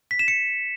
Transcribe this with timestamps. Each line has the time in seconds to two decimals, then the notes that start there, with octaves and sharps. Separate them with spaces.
0.11 B6
0.19 E7
0.28 C#7